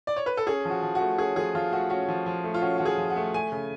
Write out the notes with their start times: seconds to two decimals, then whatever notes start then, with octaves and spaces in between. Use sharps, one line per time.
0.07 D5
0.16 C#5
0.26 B4
0.37 A4
0.46 C#4 G#4
0.65 F3 F#4
0.83 F3
0.95 A3 F#4
1.18 C#4 G#4
1.36 F3 G#4
1.55 F3 F4
1.72 A3 F#4
1.90 C#4 F#4
2.08 F3
2.26 F3
2.44 A3
2.54 F4
2.62 C#4 F#4
2.78 F3 F#4
2.86 G#4
2.97 F3
3.10 F#5
3.16 A3
3.34 A3 G#5
3.52 C#3